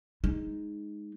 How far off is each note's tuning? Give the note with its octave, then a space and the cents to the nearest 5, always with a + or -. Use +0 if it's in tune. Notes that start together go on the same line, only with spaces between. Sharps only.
G#3 +0 D#4 +0